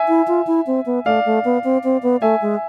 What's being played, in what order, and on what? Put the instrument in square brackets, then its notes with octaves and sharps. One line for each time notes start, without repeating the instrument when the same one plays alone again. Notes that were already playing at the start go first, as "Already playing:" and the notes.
Already playing: [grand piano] E5 G#5
[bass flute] E4
F4
E4
C4
B3
[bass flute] A3 [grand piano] D5 F5
[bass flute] A3
B3
C4
C4
B3
[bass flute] A3 [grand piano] E5 G#5
[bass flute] G#3